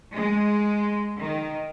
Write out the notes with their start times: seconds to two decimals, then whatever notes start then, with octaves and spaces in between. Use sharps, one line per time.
0.13 G#3
1.19 D#3